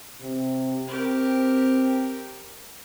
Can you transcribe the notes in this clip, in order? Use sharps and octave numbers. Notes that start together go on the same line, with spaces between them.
C3
C4 G4 A#4